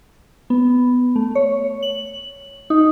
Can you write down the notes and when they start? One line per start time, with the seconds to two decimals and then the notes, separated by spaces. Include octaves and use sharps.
0.50 B3
1.16 A3
1.35 C#5
1.83 F#7
2.70 D#4